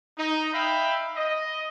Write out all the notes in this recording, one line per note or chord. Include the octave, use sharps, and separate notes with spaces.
D#4
D#4 E5 F5 G5 B5
D#5